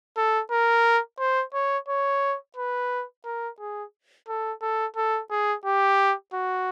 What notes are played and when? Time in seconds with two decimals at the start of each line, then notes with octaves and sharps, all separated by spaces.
0.17 A4
0.51 A#4
1.19 C5
1.54 C#5
1.88 C#5
2.56 B4
3.25 A#4
3.60 G#4
4.28 A4
4.62 A4
4.96 A4
5.30 G#4
5.65 G4
6.34 F#4